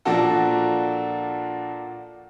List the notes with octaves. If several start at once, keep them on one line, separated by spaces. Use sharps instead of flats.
A#2 F3 A#3 D4 F#4 A4